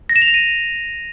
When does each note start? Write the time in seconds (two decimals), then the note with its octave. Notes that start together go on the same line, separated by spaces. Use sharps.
0.09 A#6
0.16 E7
0.22 F7
0.28 A#6
0.34 D#7